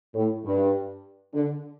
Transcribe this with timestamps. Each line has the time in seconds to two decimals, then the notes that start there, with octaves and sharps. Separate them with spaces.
0.15 A2
0.45 G2
1.34 D3